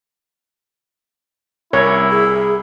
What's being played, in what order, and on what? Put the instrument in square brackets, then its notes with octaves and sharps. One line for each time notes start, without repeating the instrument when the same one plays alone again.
[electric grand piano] C2 A#4 [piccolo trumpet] E4 [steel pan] C#5
[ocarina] G#4